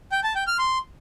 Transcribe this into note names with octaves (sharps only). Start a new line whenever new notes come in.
G5
A5
G5
F6
C6